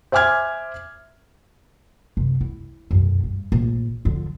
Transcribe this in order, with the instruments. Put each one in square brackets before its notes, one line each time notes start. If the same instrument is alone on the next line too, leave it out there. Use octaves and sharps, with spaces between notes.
[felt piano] C5 E5 G#5 D6 F6 G#6
[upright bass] F#2 C3
E4
B1 F#2
G2
A#1
D3 F3